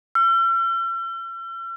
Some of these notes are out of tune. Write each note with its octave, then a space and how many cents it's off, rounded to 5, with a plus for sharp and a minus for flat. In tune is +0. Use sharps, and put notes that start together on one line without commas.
E6 +45